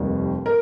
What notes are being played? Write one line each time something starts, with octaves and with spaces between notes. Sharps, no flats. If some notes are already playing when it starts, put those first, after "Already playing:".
Already playing: F1 D#2 D#3 G3
A#4